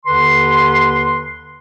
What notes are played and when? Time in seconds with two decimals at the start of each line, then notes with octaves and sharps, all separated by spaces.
0.06 D#2 D3 B4 C6